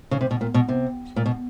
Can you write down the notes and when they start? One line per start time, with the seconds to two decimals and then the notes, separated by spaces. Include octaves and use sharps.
0.11 C#3
0.21 C3
0.31 B2
0.41 A#2
0.54 B2
0.69 C3
1.16 A#2
1.26 B2